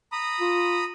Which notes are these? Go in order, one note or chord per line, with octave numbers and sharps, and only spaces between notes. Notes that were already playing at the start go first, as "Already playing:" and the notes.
A#5 B5 D#6
F4